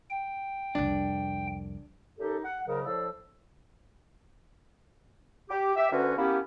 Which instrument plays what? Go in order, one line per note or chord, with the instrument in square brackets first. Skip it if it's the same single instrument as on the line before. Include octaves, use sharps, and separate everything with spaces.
[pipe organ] G5
[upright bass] C2 F2 [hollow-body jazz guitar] D4
[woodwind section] F#2 D#4 G4 A4
F#5
G#2 C#3 F#3 A#4
A2 F3 D5 E6
G4
G4 E5
D2 D3 C#4 F#4 B4
A#3 B3 C#4 E4 G4